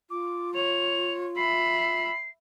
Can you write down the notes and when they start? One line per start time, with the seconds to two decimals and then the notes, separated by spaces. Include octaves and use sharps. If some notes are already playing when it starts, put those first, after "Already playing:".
0.10 F4 D6
0.55 C#5 F7
1.37 E5 B5 C7